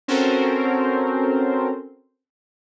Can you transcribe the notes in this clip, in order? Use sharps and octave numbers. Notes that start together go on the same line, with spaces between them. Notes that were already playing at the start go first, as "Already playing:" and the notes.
C4 C#4 F#4 A4 A#4 C5